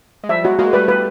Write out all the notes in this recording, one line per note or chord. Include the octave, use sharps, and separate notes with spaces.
G#3
F3 G3 E5
F#3 G#3 F#4
G#3 A#3 F#4
G3 A3 B4
B4